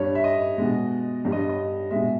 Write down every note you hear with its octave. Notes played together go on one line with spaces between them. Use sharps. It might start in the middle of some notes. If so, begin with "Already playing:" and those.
Already playing: G2 G3 C#5
E5
D#5
B2 G#3
G2 G3
D#5
D#5
B2 G#3 E5